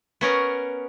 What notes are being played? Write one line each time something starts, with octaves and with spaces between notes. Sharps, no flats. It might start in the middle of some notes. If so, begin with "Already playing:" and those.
B3 C#4 A#4